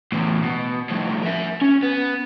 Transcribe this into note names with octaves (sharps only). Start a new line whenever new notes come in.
E2 A2
B2
F2 A2
A#4 E5
C#4
B3